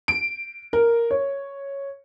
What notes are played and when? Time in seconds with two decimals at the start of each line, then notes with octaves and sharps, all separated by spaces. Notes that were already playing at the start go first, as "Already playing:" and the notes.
0.08 D7
0.73 A#4
1.11 C#5